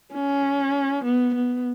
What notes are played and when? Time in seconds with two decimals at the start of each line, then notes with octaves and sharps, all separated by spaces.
0.14 C#4
1.05 B3
1.35 B3